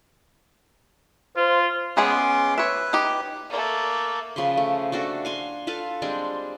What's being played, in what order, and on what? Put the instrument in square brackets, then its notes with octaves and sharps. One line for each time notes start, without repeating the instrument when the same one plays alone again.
[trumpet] F4 [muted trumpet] C5
[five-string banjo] G#3 B3 G#4 [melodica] C#4 C6 D6
[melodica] B4 [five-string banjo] C#5 E5
[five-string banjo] D#4 G4
[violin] A3 A#3
[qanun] C#3 F3 B4 C6
A3
A3 D4 F#4 A4
F5 G#5 C6
F4 A4 B4 F5
G3 G#3 C4 D4